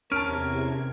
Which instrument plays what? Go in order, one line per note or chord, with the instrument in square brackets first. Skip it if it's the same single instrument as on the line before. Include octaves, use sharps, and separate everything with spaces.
[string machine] E2 C3 G#6 [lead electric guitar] C#4 A5 [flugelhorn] A#4 [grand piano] F6 D7